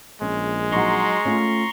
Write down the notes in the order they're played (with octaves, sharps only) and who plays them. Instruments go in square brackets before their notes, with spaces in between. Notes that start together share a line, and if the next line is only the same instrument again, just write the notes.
[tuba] A#1 [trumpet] G#3 [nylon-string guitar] C#4
[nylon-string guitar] F#3 D#4 [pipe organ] A#5 C6 C#6
[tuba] A3 [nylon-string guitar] C#4 F4